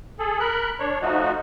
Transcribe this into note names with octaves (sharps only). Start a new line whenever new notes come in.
G#4 A4
A#4 B5 F#6
D4 C#5
F3 A3 D#4 F#4